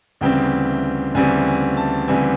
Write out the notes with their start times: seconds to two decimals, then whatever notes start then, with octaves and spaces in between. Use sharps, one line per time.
0.21 D2 C#3 E3 G3 C4 G5
1.14 D2 C#3 E3 G3 C4 G#5
1.46 G#5
1.77 A5
2.08 D2 C#3 E3 G3 C4 G#5